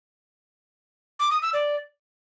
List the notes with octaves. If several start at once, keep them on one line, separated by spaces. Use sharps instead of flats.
D6
D#6
E6
D5